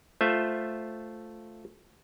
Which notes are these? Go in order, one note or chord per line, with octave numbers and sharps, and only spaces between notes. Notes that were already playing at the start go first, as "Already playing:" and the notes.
A3 F4 C5 E5